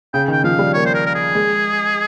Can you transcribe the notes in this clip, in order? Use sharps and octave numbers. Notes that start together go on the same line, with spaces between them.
C#3 G5
D#3 G5
F3 F5
G3
A#3 C#5
C5
A#4
A#4
G#4
G#3